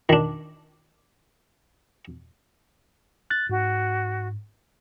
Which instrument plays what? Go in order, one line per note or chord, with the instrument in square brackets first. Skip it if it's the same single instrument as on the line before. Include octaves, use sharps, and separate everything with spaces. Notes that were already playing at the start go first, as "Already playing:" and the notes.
[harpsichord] D#3 D4
[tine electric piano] F#6 A6
[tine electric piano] G#2 [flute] F#4